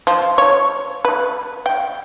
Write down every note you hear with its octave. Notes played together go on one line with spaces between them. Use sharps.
F3
C#5
B4
G5